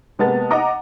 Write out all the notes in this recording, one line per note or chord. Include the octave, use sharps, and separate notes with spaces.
C3 G#3 A#3 B3 A5 A6
D#5 F#5 A#5 D6